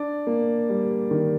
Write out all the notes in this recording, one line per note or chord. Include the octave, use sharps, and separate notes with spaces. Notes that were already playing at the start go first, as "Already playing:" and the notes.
Already playing: D4 D5
A#3
G3
D#3